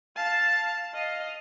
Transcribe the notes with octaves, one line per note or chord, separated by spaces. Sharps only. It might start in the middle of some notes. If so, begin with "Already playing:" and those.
F5 A5
D#5 F5